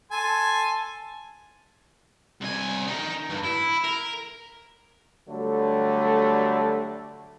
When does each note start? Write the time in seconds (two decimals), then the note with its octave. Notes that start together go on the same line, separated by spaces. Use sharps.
0.11 A4 G#5 C6
2.41 C2 G#5
2.88 D#4 A#4
3.31 G2
3.45 E4
3.85 A#4
5.28 D3 F#3 G3 A3